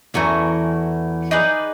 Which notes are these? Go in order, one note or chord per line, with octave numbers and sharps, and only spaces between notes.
E2 E3 A3 C#4 F#4 A#4
D#4 G#4 B4 D5